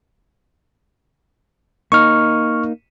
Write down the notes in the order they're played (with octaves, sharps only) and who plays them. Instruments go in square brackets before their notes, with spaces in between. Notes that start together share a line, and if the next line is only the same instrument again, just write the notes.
[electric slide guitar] A#3 D#4 [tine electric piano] C#6 F6